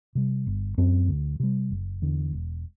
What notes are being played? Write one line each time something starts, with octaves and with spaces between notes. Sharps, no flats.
C3 G3
G1
F#2 F#3 C4
D2
C3 G3
F#1
E2 D3
E1